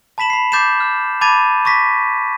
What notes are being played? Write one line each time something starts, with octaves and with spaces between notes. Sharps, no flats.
A5 B5 B6 E7 F#7
B5 C7
D6 G6 A6 C7 E7
F6
A5 B5 D6 G#6 A6 D#7
C#6 D6 A#6 B6